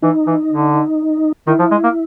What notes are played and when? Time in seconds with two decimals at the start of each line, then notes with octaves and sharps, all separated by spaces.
0.02 E3 D#4
0.27 E3
0.51 D3
1.47 D#3 E4
1.59 F3
1.71 G#3
1.84 A#3